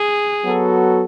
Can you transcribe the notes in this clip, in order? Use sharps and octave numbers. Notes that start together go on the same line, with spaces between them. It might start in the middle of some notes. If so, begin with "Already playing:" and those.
Already playing: G#4
F#3 B3 F#4 A4